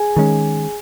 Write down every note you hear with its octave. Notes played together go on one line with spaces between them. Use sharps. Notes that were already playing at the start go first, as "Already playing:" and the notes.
Already playing: G#4 G#5
D#3 G#3 C#4